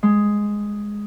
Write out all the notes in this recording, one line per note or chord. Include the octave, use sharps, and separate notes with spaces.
G#3